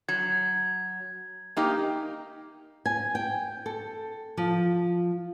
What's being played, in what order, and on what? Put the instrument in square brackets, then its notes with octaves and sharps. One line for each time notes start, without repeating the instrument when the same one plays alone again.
[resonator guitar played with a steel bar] F#3 [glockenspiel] G#6
[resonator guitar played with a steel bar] A#3 D#4 G4
[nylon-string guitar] G#5
G5
A4
F3